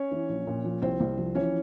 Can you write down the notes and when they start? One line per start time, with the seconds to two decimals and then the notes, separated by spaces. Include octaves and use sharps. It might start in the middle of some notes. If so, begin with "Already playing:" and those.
Already playing: C#4 C#5
0.11 E3
0.29 A#1
0.47 A#2
0.64 F3
0.82 C2 C4 C5
1.00 C2
1.18 F3
1.35 E3 C#4 C#5